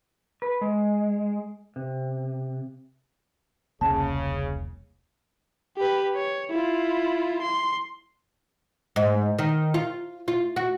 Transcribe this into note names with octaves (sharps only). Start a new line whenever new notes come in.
B4
G#3
C3
E1 C2 C#3 A#3 A5
G4 B4
C#5
E4 F4
C6
G#2
D#3
F4
F4
F#4